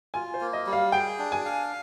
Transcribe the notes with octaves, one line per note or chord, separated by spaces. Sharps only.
F4 G#5
C5
A#3
D#5
G3
F5
G#4 G5
D4
G#5
F5